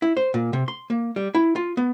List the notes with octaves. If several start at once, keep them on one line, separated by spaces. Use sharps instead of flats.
E4
C5
A#2
C3
C6
A#3
G3
E4
F4
B3